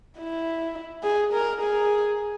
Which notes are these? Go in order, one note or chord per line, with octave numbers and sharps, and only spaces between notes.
E4
G#4
A#4
G#4